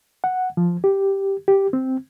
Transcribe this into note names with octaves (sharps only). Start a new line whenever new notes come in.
F#5
F3
G4
G4
C4